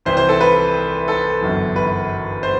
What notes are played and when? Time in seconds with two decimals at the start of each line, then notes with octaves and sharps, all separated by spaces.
0.05 C2 C3 E3 C5
0.17 C5
0.29 A4
0.41 B4
1.08 A4
1.41 G1 F#2 E3
1.76 B4
2.43 C5